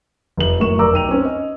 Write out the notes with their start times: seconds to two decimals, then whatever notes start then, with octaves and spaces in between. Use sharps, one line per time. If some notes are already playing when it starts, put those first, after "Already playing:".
0.37 F1 F#7
0.60 F#2 A2 A#3 C#6 E7
0.78 F1 A#4 D5 A#5 D6 E6
0.93 B1 G5 D#7 F7
1.09 C4 C#4 B4
1.25 D#5